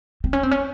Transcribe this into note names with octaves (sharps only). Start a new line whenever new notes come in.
C4
C#4
C4
C#4